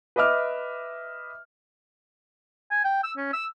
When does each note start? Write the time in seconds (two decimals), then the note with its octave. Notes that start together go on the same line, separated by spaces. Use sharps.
0.16 B4 D#5 E5 D6 F6
2.71 G#5
2.84 G5
3.04 E6
3.18 C#4
3.33 E6